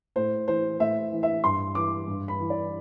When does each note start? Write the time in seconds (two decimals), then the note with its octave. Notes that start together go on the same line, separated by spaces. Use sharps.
0.16 A2 C5
0.47 E3 C5
0.80 A2 E5
1.12 E3
1.23 E5
1.44 G2 C6
1.75 E3 D6
2.07 G2
2.28 B5
2.39 E3
2.50 D5